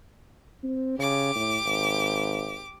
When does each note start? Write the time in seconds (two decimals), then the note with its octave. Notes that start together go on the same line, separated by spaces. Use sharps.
0.63 C4
0.98 C#3 G4 D6
1.35 A2
1.65 G#1